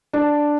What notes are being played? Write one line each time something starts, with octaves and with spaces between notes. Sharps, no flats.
D4